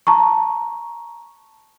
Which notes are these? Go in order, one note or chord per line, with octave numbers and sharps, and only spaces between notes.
A5 A#5 C#6